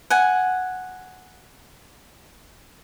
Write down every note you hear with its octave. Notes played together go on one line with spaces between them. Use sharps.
F#5 G#5